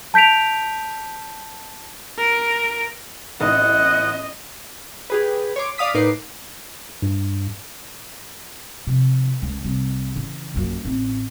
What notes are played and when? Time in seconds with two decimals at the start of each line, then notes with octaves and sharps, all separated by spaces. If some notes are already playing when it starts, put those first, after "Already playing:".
0.14 A5 G6 B6 D7 F7
2.18 A#4 D7
3.41 A1 D#5 F#5 D#6
5.10 G4 G#4 B4
5.56 C#5 C6 D6
5.78 D5 F5 D#6 B6
5.94 A2 D#4 A#4 B4 D6 C7
7.02 G2
8.87 C3 F3
9.42 C#2
9.64 C2
10.16 C#3 E3
10.54 A#1 F#2
10.85 A1 C4